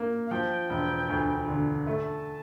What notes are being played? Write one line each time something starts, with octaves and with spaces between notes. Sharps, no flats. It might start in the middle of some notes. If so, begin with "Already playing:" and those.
Already playing: A#3
F5
F3 G5
E1
D2
D3
A3 A5